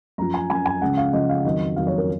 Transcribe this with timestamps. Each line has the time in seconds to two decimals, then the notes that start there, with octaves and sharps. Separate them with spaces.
0.18 F#2 F3 A#5
0.34 G#5
0.50 F#2 F3 G#5
0.66 G#5
0.81 C#2 C#3 F3 F#5
0.97 F5
1.13 C#2 C#3 F3 D#5
1.29 F5
1.45 F2 D#3 F#3 D#5
1.76 F2 D#3 F#3 F5
1.87 C#5
1.98 A#4